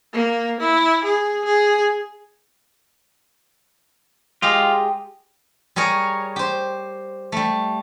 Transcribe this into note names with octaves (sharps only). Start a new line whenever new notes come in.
A#3
E4
G#4
G#4
G#3 F4 G4 D#5
G3 G#4 A#4 C#5
G4 C5
G3 A3